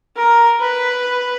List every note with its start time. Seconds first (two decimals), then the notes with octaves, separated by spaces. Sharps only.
0.17 A#4
0.61 B4